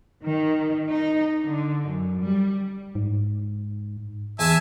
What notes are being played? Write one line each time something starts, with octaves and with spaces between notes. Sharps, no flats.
D#3
D#4
D3
F#2
G3
G#2
E2 E5 G#5 A5